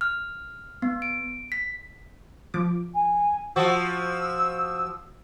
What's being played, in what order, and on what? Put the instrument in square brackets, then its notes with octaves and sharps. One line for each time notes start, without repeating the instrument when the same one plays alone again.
[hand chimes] F6
B3
D7
B6
[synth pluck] F3 D6
[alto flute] G#5
[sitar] F3 F#4 [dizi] E6